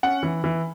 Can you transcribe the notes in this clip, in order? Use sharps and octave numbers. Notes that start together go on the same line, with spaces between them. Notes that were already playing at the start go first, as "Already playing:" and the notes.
C#4 F#5
E3
E3